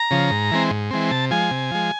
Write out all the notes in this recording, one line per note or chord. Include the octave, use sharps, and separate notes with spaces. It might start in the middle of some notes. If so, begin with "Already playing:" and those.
Already playing: A#5
C#3 F3
G#2
E3 G#3 C4
G#2
E3 G#3 C4
C3 A5
F3 G#3 G#5
C3
F3 G#3